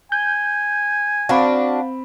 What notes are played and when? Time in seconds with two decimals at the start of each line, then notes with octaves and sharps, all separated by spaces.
0.12 G#5 G6
1.29 C4 D4 F#4 F5 F#5 B5